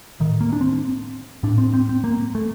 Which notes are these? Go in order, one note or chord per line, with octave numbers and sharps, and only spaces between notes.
A2 D#3
A#3
D4
C4
A2 D4
C4
C4
C4
A#3
A3